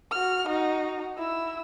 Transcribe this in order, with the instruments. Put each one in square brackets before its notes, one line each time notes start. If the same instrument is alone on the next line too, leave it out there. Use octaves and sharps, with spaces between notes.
[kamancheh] F#4 F6
D#4 F#4
E4 E6